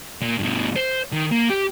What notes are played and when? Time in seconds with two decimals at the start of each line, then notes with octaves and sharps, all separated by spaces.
0.21 A#2
0.38 G2 B2
0.76 C5
1.12 D#3
1.32 A#3
1.50 G4